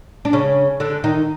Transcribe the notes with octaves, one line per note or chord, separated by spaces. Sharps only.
D4
C#3 C#4
D3 D4
D#3 D#4